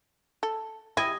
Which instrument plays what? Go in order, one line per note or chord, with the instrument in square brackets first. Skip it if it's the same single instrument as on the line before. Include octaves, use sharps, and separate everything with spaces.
[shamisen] A4
[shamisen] E4 [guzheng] D#5 G#5